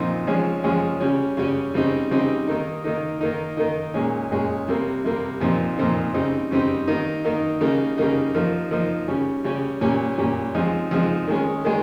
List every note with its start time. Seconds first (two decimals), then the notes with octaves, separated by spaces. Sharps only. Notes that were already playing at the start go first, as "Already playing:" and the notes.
Already playing: A#2 F3 C4 D#4
0.27 F3 G#3 C#4
0.64 F3 G#3 C#4
1.00 C#3 G3 C#4
1.37 C#3 G3 C#4
1.74 C#3 G3 C4 D#4
2.11 C#3 G3 C4 D#4
2.47 D#3 A#3 D#4
2.84 D#3 A#3 D#4
3.21 D#3 A#3 D#4
3.57 D#3 A#3 D#4
3.94 A#2 G#3 C#4
4.31 A#2 G#3 C#4
4.68 C3 G3 A#3
5.04 C3 G3 A#3
5.40 A#2 F3 C4 D#4
5.77 A#2 F3 C4 D#4
6.14 C#3 G3 C4 D#4
6.51 C#3 G3 C4 D#4
6.88 D#3 A#3 D#4
7.24 D#3 A#3 D#4
7.61 C#3 G3 A#3 D#4
7.98 C#3 G3 A#3 D#4
8.35 F3 A#3 D#4
8.71 F3 A#3 D#4
9.08 C#3 G3 C#4
9.44 C#3 G3 C#4
9.81 A#2 G3 C#4
10.18 A#2 G3 C#4
10.54 F3 G#3 C4 D#4
10.91 F3 G#3 C4 D#4
11.28 D#3 G#3 C#4
11.65 D#3 G#3